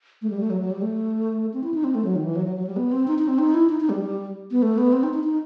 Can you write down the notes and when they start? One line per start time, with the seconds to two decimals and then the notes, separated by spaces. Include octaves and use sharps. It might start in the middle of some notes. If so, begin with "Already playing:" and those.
0.22 A3
0.30 G3
0.40 A3
0.50 F#3
0.61 F#3
0.71 G3
0.82 A3
1.54 C4
1.64 E4
1.74 D#4
1.84 C4
1.95 A3
2.05 F#3
2.15 D#3
2.25 E3
2.36 F#3
2.46 F#3
2.56 F#3
2.67 G3
2.76 B3
2.92 C4
3.07 D#4
3.18 D#4
3.28 C4
3.39 D#4
3.54 E4
3.69 D#4
3.80 D#4
3.89 G3
4.01 G3
4.51 B3
4.62 A3
4.78 B3
4.93 C4
5.03 D#4
5.14 D#4
5.24 D#4